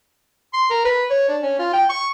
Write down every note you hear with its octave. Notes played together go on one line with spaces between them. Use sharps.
C6
A#4
B4
C#5
D4
C#4
F4
G5
C#6